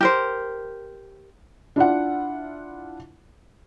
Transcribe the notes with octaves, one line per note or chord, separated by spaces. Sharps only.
G4 A#4 C5
D4 E4 F4 F#5